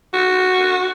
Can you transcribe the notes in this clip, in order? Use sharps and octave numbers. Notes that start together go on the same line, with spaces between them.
F#4